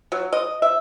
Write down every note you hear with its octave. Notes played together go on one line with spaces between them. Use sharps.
F#3
D#5
E5